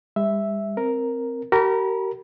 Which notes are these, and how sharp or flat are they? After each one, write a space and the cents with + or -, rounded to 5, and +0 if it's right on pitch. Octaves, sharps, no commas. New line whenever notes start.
G3 +45 E5 +0
C4 +0 A#4 +0
G4 -45 A#4 -20 B5 -30